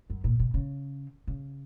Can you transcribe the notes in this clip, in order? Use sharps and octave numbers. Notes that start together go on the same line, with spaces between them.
F#2
A#2
B2
C#3
C#3